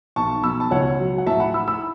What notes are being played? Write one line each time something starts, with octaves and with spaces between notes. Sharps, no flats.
B1 A5 C#6
B2 B5 E6
A5
C#2 C#5 F#5
F#3
F#5
A2 E5 A5
F#5 B5
E4 B5 E6
B5 E6